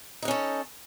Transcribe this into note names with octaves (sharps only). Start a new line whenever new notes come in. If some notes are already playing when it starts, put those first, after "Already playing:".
C#4 D#4 F#4 A4